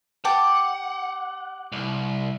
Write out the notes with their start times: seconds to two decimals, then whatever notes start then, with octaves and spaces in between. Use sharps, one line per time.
0.25 G4 F#5 A5 D6
1.72 C2